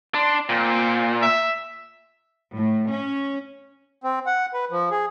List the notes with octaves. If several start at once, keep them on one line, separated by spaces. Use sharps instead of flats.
D4 C6
A#2 C4
E5
A2
C#4
C4
F#5
B4
F3
G#4